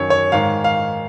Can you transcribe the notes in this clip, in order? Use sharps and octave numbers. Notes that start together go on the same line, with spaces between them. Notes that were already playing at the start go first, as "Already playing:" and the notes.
Already playing: F#2 D#3 C#5
C#5
G#2 D#3 F5
F5